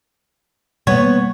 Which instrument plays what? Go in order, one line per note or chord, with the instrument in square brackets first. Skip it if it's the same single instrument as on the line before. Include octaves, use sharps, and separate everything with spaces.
[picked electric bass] B2 G3 A#3 [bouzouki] B3 C#5